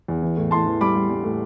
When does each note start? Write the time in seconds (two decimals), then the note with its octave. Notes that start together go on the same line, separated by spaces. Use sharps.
0.08 E2
0.22 E3
0.37 A2
0.51 A2 A5 C6
0.66 E3
0.81 G3 B5 D6
0.95 G3
1.09 G3
1.24 A2